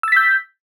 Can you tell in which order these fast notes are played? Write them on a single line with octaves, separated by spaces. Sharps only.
E6 A6 B6 G6